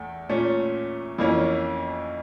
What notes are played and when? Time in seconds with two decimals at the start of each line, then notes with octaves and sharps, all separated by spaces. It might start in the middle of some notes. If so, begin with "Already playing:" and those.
Already playing: E2 A3
0.29 A#2 A3 C#4
1.18 F2 E3 A#3 C#4